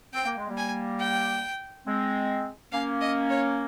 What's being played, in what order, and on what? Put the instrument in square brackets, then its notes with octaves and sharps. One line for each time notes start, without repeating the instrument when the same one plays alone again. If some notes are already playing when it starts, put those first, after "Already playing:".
[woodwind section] C4 [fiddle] G5
[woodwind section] A#3
G#3
G3 A#3
[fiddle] G#5
G5
[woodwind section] G#3 C4
[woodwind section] A#3 C#4 [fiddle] F5
[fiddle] D#5
C#5